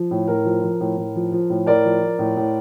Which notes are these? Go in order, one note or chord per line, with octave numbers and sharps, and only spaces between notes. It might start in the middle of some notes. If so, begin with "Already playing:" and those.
Already playing: F3
A2
A2 A#4
F3
F3
A2
A2
F3
F3
A2
A2 A#4 D5
F3
F3
A2
A2